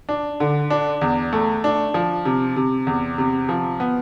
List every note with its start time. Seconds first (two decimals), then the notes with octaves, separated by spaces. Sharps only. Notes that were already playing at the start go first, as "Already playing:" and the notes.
0.09 D4
0.40 D3
0.70 D4
1.01 E2
1.33 A3
1.64 D4
1.94 F3
2.25 C3
2.56 C3
2.87 E2
3.18 C3
3.49 F3
3.80 B3